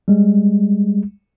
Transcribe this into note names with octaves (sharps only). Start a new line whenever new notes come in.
G3 G#3